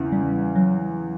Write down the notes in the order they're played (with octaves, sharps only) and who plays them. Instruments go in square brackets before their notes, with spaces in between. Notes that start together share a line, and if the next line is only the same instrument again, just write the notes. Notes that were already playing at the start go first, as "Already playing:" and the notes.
Already playing: [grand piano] E2 C#3
[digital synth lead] G3
F#3